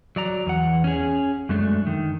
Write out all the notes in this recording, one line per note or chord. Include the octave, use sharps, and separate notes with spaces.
F#3 D5 A#5
E2 F#5
C#4 G#4
F#2 G#3 A3 D4
D#3